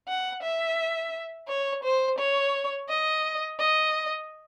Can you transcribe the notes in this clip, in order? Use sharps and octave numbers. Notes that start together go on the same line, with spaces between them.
F#5
E5
C#5
C5
C#5
D#5
D#5